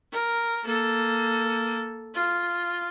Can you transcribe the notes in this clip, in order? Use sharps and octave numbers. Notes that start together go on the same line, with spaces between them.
A#4
A#3 A4
F4